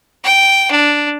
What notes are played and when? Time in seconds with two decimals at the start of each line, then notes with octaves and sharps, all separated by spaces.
0.24 G5
0.71 D4